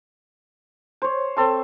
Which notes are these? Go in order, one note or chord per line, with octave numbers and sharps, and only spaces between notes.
C5 C#5
C4 A4 C6